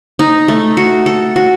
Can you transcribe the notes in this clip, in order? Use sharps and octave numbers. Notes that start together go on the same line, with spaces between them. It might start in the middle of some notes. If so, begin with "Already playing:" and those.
D#4
A3
F#4
A4
F#4